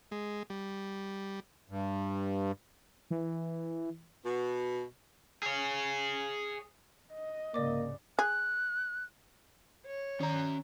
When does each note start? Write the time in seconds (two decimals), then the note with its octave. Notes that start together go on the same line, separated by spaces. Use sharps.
0.11 G#3
0.50 G3
1.70 G2
3.11 E3
4.24 B2
5.43 G#4 C#5
7.12 D#5
7.54 C2 G#2 C#3 A#3 D5 D6
8.19 G#4 F#6
9.86 C#5
10.20 D#3 C#4 A#5